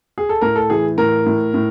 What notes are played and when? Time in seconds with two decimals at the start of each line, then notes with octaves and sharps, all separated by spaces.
0.18 G#4
0.29 A4
0.41 A2 A#4
0.56 A4
0.70 E3 G#4
0.98 A2 A#4
1.26 A2
1.54 A2